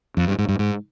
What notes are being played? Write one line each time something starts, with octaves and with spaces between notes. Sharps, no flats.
F2
G2
G#2
G2
G#2